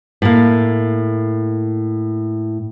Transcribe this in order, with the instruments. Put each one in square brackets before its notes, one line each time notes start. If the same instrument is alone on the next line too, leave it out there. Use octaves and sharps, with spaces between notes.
[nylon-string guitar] A2 A#3